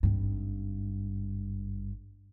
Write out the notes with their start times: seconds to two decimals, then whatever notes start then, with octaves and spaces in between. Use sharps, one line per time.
0.03 G#1 G2